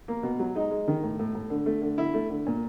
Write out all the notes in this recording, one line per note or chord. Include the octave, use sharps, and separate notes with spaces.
A#3
B2
F#3
G#3 D#4
G#3
D#3
A2
A2
A2
D3
A3
D3
D3 E4
A3
D3
A#2